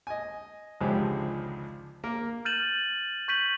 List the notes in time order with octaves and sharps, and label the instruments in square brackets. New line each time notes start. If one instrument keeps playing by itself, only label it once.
[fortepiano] D#5 G#5
G#1 C#2 D3 F3 G4 G#4
A#3 A#4
[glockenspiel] F6 G6 A6 D#7 E7 F#7
C#6 G6 B6 D#7 F#7